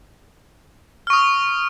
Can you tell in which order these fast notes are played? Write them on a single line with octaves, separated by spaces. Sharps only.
F6 C#6 D#6